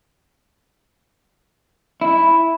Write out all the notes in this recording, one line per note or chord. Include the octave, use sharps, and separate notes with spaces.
E4